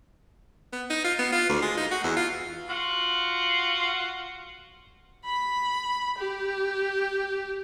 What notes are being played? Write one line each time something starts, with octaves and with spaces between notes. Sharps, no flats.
B3
D#4
F4
B3
F4
D2
G#3
D#4
F#4
E2
F4
F4 F#4 F#5
B5
G4